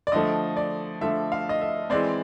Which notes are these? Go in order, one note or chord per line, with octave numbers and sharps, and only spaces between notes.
D5
D3 F3 A3 D#5
D5
D3 F3 A3 E5
F5
D#5
E5
E3 G#3 C4 D5